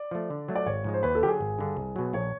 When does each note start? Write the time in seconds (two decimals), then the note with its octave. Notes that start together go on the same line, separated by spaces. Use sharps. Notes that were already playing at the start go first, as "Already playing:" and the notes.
Already playing: D5
0.11 F3 A3
0.30 D3
0.48 F#3 A3
0.56 D5
0.66 G#1 C#5
0.84 G#2 F3 G#3
0.94 C5
1.03 D#2 B4
1.15 A4
1.21 D3 G4
1.26 F#3 G#4
1.41 G#1
1.59 G2 D3
1.77 C2
1.96 B2 F#3
2.13 A#1 C#5